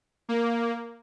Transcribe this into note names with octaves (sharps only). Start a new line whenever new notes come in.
A#3